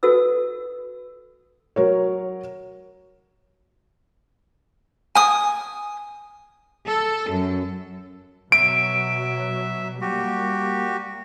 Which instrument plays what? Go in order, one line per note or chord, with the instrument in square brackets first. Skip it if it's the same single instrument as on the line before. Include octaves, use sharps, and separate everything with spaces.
[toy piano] F#4 A4 B4 E6
[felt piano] F#3 A#4 C#5
[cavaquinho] G#5 D#6
[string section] A4
F#2
[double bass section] B2 F#3 [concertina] E5 [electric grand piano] D7
[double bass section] G3 A#3 [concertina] F#4 G4